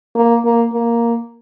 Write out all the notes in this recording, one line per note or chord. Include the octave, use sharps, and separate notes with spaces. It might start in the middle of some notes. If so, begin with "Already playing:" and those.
A#3
A#3
A#3